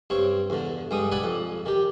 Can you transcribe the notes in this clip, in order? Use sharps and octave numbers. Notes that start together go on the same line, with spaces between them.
G2 C4 C#5
E2 D3
G2 G3 G#3 D#6
A4 D5 F#5 G#5 B5
F2
D#3 G4